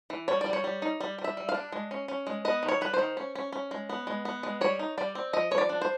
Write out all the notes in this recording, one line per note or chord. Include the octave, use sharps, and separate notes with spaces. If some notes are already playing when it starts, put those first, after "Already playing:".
E3
G3 C#5
D5
G3
C#5
G3
D#4
G3
G3
E5
G3
F5
D4
G#3
C#4
C#4
G#3
B3 D#5
D#3
C#5
G3 B4
D#3 C5
C#4
C#4
C#4
G#3
B3
G#3
B3
G#3
G3 C#5
D#4
G3 D5
C4
F3 D#5
F3 C#5
D5
D4
C5